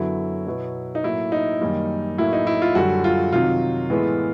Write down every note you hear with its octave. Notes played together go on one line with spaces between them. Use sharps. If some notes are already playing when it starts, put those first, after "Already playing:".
Already playing: F#2 D3 F#3 B3 E4
B2 F#3 B3
D#4
A2 F#3 A#3 E4
D#4
F#2 D#3 G3 A#3
A2 F#3 A#3 E4
D#4
E4
F4
F#2 D3 G3 F#4
F4
C3 D#3 F#3 F4
A2 E3 G#3 B3